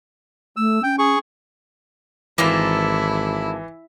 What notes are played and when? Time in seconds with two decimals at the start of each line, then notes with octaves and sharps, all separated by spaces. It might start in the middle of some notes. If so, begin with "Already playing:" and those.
0.57 A3 E6
0.83 C#4 G5
0.99 G#4 C#6
2.38 G#1 E3 A#3 E4 F4 A4